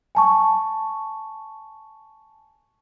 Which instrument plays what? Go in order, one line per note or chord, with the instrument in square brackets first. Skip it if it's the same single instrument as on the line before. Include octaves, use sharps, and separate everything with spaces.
[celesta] G#5 A5 C#6